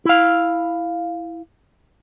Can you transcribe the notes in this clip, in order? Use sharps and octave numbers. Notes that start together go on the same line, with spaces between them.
E4 F5